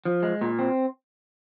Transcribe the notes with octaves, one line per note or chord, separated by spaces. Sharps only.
F3
G#3
A#2
C4